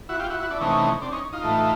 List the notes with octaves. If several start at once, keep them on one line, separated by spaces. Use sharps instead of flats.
E4 F#4
F4 G4
E4 F#4
E4 F#4
D4 E4
C3 E3 A3 C#4 D#4
C4 D4
C#4 D#4
D#4 F4
A2 E3 A3